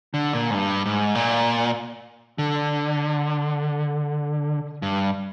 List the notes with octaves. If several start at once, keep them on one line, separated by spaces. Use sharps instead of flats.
D3
A#2
G#2
G2
G#2
A#2
D3
G2